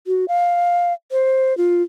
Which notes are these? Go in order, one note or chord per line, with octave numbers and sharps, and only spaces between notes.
F#4
F5
C5
F4